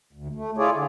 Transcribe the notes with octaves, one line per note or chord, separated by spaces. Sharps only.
D2
A3
E4 F4 G#4 C#5 D5
D3